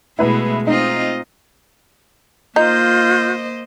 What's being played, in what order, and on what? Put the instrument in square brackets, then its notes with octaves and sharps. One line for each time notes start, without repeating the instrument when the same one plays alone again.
[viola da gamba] B2 G#3 A3 [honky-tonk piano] E4 B4 B5
[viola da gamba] C4 F4 D#5 [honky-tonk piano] D#4
[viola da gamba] A#3 C5 D#5 [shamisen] D#4 [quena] F4 [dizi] G6